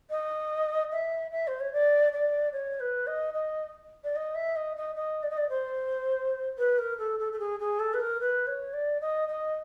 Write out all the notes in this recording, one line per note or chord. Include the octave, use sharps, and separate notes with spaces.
D#5
E5
E5
C5
C#5
D5
D5
C#5
B4
D#5
D#5
D5
D#5
E5
D#5
D#5
D#5
D5
D#5
D5
C5
B4
A#4
A4
A4
A4
G#4
G#4
A4
B4
A#4
B4
C#5
D5
D#5
D#5